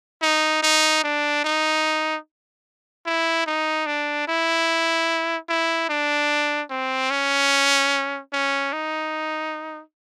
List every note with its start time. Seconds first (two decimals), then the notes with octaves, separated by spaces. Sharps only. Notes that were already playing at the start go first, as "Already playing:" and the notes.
0.22 D#4
0.63 D#4
1.04 D4
1.44 D#4
3.06 E4
3.46 D#4
3.86 D4
4.28 E4
5.49 E4
5.89 D4
6.70 C4
7.10 C#4
8.33 C#4
8.73 D#4